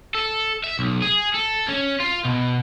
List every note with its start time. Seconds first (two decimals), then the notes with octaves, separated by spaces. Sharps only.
0.15 A4
0.64 E5
0.79 B1
1.02 G#4
1.34 A4
1.69 C#4
2.00 F4
2.25 B2